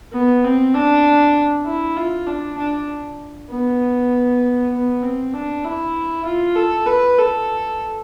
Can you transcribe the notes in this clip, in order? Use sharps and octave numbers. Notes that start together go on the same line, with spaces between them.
B3
C4
D4
E4
F4
D4
D4
B3
B3
C4
D4
E4
F4
A4
B4
A4